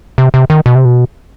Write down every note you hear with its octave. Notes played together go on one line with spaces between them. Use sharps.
C3
C3
D#3
B2
C3
B2